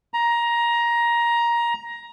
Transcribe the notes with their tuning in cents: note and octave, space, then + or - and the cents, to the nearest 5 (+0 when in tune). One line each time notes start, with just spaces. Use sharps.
A#5 +15